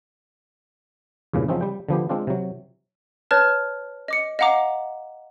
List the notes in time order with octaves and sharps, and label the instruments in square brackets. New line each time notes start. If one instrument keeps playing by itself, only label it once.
[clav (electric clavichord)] E2 G2 A#2 C#3
C#3 F3 F#3 C4 C#4 D#4
G3 G5
D3 F3 B3 G4
G#3 C4 D4 F4
C3 F#3
[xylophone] B4 C#5 A5 F6 A6
D#5 D6 C#7
D#5 F5 F#5 A#5 D6